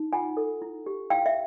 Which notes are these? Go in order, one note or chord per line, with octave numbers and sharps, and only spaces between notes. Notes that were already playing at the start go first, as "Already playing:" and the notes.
Already playing: D#4
F4 F#5 G#5
A4
E4
G4
E4 F5 G5
E5